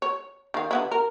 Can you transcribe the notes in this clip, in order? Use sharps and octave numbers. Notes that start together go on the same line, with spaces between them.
C#5
D#3 F5
D3 B3 E4
A#4